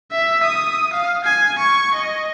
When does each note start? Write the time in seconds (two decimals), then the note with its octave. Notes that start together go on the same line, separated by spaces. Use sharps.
0.12 E5
0.43 D#6
0.93 F5
1.24 G#5
1.59 C#6
1.94 D#5